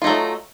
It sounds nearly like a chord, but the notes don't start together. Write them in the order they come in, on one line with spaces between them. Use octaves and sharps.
F4 D#4 A3 F#3